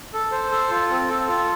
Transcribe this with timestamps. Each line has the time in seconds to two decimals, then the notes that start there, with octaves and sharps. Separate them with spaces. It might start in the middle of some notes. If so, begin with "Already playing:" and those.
0.14 A4
0.32 C5
0.52 A4
0.71 F4
0.90 C4
1.09 A4
1.28 F4